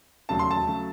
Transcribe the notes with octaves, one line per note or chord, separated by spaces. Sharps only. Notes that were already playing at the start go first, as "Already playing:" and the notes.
E1 D#2 C#3 F#3 A3 A5
C6
A5
C#3 F#3 A3